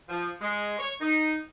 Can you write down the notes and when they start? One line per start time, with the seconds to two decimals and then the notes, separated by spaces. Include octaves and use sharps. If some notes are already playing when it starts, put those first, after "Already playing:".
0.09 F3
0.41 G#3
0.78 C#5
0.99 D#4